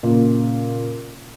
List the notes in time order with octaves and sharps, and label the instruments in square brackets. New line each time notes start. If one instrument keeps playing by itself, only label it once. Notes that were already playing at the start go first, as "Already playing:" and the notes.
[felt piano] A#2 C#3